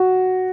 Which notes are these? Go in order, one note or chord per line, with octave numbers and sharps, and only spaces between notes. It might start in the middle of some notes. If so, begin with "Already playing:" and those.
Already playing: F#4